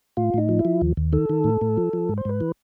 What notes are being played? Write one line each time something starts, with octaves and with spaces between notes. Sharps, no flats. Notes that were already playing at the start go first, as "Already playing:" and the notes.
A2 F4
A2 D#4
F3
E4
F3
D#2
D#2
D#3 A4
D#3
A2
A2
F3
F3
G#2
C5
G#2 B4
E3